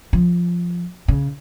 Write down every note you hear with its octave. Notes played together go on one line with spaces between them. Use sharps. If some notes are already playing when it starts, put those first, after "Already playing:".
F3
C#3